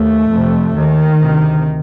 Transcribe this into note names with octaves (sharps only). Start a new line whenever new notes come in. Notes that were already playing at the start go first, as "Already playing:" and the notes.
Already playing: D#2 A3
F2 C3
D#2 D#3
D2 C3